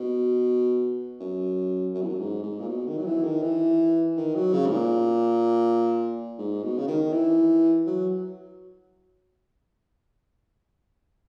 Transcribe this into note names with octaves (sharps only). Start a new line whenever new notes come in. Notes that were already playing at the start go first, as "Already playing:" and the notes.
Already playing: B2
F#2
F#2
E2
F#2
G#2
G#2
A#2
B2
D#3
F#3
E3
D#3
E3
D#3
F#3
C#3
G#2
A#2
G#2
B2
C#3
D#3
E3
F#3